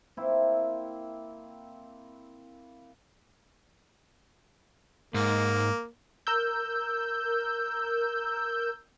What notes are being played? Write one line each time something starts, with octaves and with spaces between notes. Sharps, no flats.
A#3 C4 E4
G#2 A#3
A#4 E6 G6